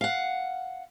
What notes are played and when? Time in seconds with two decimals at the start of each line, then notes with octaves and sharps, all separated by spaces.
0.01 F5 F#5